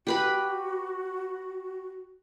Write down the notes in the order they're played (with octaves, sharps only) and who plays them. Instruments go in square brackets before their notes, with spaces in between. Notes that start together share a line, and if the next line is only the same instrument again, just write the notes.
[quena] F#4 [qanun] G4 B4 B5